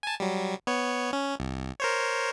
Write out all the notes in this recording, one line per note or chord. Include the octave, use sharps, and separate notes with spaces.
G#5 A5
F#3 G3
B3 C#5
C#4
C2
A#4 C5 C#5